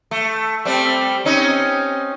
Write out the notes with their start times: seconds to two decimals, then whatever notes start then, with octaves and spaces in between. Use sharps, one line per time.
0.11 A3
0.65 G3 A3 C4
1.25 C4 C#4 D#4